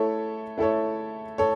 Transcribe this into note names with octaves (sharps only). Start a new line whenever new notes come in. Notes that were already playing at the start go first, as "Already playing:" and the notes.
Already playing: A3 E4 A4 C#5
A3 E4 A4 C#5
A4 C#5